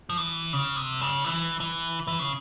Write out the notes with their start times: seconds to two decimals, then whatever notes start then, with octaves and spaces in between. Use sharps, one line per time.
0.10 F3
0.17 E3
0.53 C#3
0.76 C3
1.01 C#3
1.25 E3
1.60 E3
2.07 E3
2.19 C#3